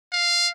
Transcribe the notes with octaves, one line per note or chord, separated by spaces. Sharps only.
F5